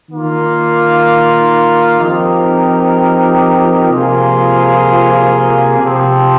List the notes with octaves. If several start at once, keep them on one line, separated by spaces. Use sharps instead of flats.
D#3 A#3 F4
F3 C4 D#4 G4 A#4
C3 F3 A#3 F4 G#4
C3 F3 C4